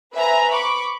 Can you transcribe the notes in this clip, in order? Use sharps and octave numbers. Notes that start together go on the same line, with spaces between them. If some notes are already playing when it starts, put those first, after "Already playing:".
B4 C5 E5 G#5 A#5
B5 C#6 D6